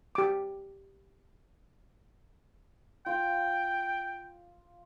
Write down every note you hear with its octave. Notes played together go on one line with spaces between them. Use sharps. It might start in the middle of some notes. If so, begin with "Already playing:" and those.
G4 D6
F4 F5 G5